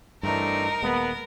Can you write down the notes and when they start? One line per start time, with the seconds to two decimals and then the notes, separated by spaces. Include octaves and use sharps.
0.23 G2 E3 A3 C4 D4 D#4 A#4
0.82 D#1 G#3 A#3 B3